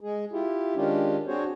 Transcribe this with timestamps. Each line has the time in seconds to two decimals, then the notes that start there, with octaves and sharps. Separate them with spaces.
0.01 G#3 G#4
0.32 E4 F4 G4
0.76 D#3 G#3 C#4 D4 F4 G4
1.27 C4 D4 F#4 G#4 C5 C#5